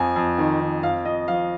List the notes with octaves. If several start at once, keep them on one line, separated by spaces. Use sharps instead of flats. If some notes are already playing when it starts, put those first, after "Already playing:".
Already playing: F2 F3 G#5
F2
D#3
D#3
F2 F5
F2 D#5
F3 F5